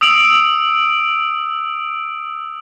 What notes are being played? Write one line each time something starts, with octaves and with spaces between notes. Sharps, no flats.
D#6 E6 D7 F7 F#7